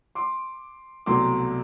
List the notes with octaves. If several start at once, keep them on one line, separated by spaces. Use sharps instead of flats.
C6 D6
C2 B2 F#3 A3 C4 C6 D6